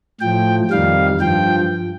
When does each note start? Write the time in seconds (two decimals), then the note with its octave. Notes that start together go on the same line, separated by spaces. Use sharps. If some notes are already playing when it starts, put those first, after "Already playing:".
0.21 A2 F3 G5
0.70 F2 D#3 G3 F5
1.21 G2 F3 G5